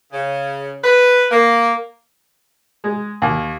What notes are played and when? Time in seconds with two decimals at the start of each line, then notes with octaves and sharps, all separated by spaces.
0.12 C#3
0.83 B4
1.31 A#3
2.84 G#3
3.22 D#2